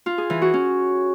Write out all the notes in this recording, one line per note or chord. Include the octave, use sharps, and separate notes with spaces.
F4
G#4
E3
F#4
C#4